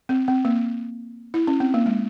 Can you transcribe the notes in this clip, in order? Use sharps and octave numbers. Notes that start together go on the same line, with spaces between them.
C4
C4
A#3
E4
C#4
C4
A#3
G#3